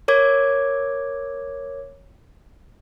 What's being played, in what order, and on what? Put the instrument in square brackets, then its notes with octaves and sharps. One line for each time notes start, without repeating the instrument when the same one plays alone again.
[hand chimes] A#4 C#5 D6 G#6